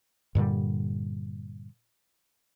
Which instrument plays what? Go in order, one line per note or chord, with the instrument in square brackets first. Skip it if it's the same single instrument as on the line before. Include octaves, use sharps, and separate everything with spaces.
[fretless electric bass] G2 A#2 D3 G3